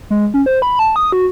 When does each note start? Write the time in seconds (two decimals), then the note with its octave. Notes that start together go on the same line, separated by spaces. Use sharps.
0.10 G#3
0.34 C#4
0.46 C5
0.62 B5
0.79 A5
0.96 D#6
1.12 F#4